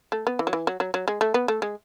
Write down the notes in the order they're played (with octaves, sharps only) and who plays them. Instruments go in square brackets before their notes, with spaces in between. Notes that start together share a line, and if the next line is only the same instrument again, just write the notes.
[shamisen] A3
B3
E3
F#3
E3
F#3
F#3
F#3
G#3
A3
B3
A3
G#3